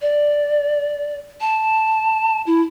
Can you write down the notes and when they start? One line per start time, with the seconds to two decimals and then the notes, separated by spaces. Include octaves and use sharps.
0.02 D5
1.41 A5
2.47 E4